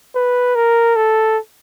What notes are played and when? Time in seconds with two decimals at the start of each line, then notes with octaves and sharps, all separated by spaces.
0.15 B4
0.56 A#4
0.96 A4